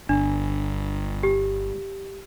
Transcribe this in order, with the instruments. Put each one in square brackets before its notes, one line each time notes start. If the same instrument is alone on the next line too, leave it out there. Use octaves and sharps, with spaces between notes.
[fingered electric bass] G1 [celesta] D4
[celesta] G4